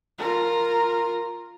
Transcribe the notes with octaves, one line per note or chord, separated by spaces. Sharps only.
F4 A#4